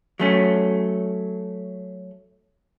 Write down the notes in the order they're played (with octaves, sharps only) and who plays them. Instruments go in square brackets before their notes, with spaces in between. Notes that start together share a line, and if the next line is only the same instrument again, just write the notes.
[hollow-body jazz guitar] F#3 A3 C#4